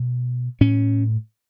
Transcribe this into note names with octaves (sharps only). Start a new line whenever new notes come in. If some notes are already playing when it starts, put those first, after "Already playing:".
Already playing: B2
A2 C#4